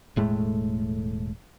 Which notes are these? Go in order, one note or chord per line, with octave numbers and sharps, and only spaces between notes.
E1 A2 G#3 A3